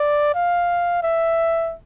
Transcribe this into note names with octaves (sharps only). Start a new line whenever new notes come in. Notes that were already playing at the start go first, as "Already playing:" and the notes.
Already playing: D5
F5
E5